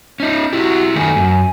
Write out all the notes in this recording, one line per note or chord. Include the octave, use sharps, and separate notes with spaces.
C#4 D#4
E4 F#4 G4
D#3 A3 G#5
F#2